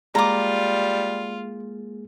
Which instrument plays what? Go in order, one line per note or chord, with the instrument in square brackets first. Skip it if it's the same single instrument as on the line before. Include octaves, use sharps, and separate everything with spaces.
[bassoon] G3 [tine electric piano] G#3 A#3 G#4 [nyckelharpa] F4 [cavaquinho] A#5 D6